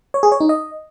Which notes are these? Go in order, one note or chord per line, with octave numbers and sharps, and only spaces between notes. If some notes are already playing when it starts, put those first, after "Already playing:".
C#5
G#4
C#5
D#4
D#5